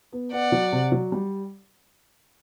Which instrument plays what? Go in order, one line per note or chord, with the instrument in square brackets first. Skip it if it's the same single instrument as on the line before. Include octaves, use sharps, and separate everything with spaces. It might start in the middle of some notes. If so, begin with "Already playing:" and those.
[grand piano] B3
[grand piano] B3 [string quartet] D5 F#5
[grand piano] F#3
C3
F#3
G3